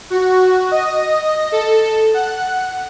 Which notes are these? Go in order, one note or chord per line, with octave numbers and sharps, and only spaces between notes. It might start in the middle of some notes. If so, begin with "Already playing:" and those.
F#4
D#5
A4
F#5